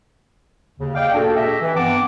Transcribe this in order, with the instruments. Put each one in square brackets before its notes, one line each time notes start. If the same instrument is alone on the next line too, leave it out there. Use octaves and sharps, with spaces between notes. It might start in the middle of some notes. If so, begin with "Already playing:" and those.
[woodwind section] D#2 C#3
D5 D#5 F5 G5
A#2 A#3 D4 F#4 G#4 A4
G4 D#5 E5
E3
G2 B3 C4 F#5 A5 D6